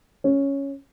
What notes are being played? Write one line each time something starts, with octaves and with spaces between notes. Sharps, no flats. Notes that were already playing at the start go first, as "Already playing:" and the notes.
C#4